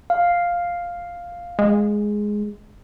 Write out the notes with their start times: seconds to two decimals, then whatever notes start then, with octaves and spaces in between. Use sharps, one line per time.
0.10 F5
1.59 G#3